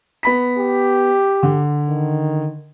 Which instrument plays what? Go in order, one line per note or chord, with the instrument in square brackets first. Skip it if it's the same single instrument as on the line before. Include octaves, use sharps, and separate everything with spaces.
[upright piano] B3 B5 B6
[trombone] G4
[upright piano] D3
[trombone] D#3